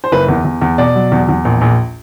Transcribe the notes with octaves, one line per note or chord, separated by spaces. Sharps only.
C5
F#1 B4
E2
E2
E2
B2 D5
F#3
E2
E2
A#1
A#1